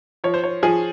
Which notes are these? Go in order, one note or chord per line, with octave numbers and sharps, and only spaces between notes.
F3 C#5
C5
C#5
F3 G#4